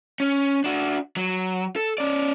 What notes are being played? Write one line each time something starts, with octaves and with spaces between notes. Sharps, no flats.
C#4
D4 F#4
F#3
A4
C#4 D5